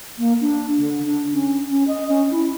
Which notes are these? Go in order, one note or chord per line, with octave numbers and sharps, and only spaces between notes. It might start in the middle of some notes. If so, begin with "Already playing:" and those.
A#3
D4
D3
D4
C#4
C#4
D#5
C#4
E4